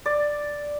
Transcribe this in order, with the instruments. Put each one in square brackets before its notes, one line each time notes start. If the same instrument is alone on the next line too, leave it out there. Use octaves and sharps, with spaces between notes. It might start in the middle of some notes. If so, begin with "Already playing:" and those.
[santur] D5